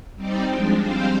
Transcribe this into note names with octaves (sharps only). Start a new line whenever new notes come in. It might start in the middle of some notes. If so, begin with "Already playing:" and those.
G3 C4 D#4 G4 D5
F3 G#3 D4
G3 C4 G4 C5 F5